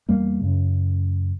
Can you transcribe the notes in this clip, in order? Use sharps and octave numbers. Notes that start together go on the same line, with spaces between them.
E2 G3 A#3
F#2 C#3